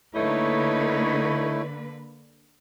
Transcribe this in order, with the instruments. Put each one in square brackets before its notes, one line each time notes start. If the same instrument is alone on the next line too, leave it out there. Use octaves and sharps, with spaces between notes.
[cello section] D3 A#3 B4 [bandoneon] A3 E4 [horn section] D#4 C#5